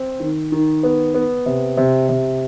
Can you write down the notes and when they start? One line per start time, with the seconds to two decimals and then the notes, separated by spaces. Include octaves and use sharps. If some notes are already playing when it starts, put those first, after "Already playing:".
Already playing: C4
0.20 D#3
0.52 D#3
0.83 B3
1.14 B3
1.46 C3
1.77 C3
2.09 C3